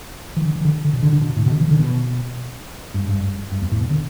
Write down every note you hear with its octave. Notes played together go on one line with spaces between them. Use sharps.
E3
D3
E3
D3
D3
B2
D3
D3
B2
A2
B2
D3
E3
D3
B2
G2
G2
G2
G2
E2
A2
B2
D3